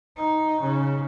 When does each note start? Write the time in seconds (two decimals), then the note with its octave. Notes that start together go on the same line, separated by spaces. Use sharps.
0.17 D#4
0.61 C#3